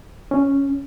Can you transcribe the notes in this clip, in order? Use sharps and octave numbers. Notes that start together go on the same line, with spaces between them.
C#4